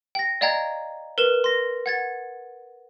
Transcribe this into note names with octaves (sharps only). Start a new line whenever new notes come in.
G5 A#6
D5 D#5 F5 G5 A#5 G#6
A#4 B4 E7
C6 A#6
F#5 G#6 A6